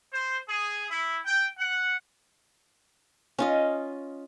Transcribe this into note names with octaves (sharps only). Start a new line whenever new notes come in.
C5
G#4
E4
G5
F#5
C#4 F4 D#5